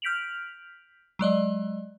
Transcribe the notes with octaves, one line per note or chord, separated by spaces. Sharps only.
F6 G6 B6 D7 F7 F#7
F#3 G#3 D5 D#5